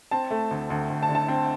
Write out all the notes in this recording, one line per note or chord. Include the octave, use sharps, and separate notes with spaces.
C4 A5
A3
D2
D2
D2
A5
D3
A5
C4